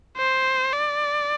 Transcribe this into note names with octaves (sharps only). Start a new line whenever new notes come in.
C5
D5